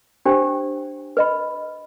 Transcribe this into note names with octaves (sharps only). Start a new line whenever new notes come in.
D4 G4 C5 G5
B4 D#5 B5